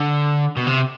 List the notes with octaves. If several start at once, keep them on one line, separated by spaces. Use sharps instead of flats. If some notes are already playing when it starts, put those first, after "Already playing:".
Already playing: D3
B2
C3